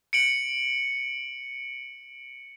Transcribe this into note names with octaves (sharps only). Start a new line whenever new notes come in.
C#7 D7 F#7